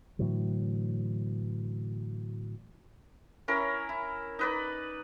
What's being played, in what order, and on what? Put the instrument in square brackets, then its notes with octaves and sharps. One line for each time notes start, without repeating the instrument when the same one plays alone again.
[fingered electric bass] A2 D3 E3 F#3
[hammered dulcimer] C#4 E4 A#4
E4
D#4 B4 D5